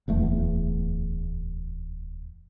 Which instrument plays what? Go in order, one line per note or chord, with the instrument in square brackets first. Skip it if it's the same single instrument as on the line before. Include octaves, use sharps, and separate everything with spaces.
[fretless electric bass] D1 E2 A3